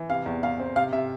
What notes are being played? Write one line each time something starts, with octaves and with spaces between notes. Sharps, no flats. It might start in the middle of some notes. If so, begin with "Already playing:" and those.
Already playing: E3
C3 F5
E2
E2 F5
C4
C3 F5
C3 E5